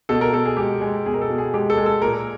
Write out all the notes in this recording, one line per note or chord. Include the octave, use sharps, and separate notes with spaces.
B2 A4
A#4
B2 A4
G#4
G#3 G4
G#3
B2 G#4
A#4
A4
B2
G#4
G#3 G4
A4
G#3
A4
A#2 A#4